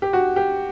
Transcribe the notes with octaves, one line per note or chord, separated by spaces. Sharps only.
G4
F#4
G4